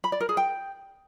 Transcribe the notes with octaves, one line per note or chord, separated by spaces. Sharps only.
B5
D5
A#4
G#4
G5